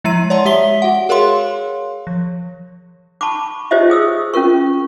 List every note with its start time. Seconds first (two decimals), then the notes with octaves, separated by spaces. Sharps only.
0.04 F3 G#3 E4 A#5 D#7
0.30 C#5 D5 F#5 A5 C6
0.45 G#3 G4 E5 B6 G7
0.82 F#4 F#5
1.09 G#4 A#4 C#5 F5 C6
2.07 F3
3.21 A5 B5 C#6 D6
3.71 F4 G4 C5 C#5 D#5 E5
3.90 G#4 D#6 E6
4.34 C#4 F4 A#4 C#6